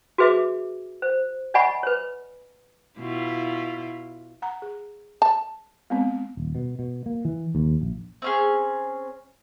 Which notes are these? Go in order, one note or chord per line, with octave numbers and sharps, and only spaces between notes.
F#4 G#4 B4 E5 D6
C5
D5 D#5 F#5 G#5 B5 C#6
B4 C#5
B2 E4 F4
F#5 A#5
G#4
A5
G#3 B3 C4
D#1
B2
B2
A#3
E3
D#2
A#1
C4 C#4 G#4